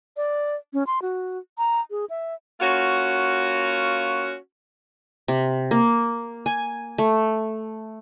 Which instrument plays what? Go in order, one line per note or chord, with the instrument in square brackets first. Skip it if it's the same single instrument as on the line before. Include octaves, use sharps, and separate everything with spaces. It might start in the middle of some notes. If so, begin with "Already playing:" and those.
[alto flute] D5
C#4
C6
F#4
A#5
G#4
E5
[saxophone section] A#3 C#4 F4 F#4
[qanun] C3
A#3
G#5
A3